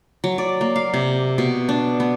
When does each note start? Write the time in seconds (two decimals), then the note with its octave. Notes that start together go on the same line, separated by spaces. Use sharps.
0.24 F#3
0.38 D5
0.61 A#3
0.76 F5
0.93 C3
1.38 B2
1.69 D4
2.00 B3